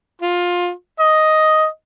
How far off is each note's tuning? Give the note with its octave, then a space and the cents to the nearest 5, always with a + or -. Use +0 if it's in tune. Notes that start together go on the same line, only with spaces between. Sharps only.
F4 +20
D#5 +5